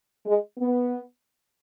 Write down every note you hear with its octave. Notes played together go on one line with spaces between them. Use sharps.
G#3
B3